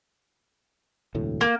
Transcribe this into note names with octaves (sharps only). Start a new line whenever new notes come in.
E1 D2 A2
A#3